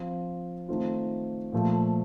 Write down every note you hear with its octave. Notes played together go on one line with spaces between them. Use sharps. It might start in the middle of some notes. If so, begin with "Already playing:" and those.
Already playing: F3 C4 F4
D#3 A3 C4 F4
A#2 F3 A3